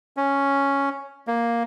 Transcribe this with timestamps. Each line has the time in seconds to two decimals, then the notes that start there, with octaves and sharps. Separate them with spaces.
0.17 C#4
1.27 A#3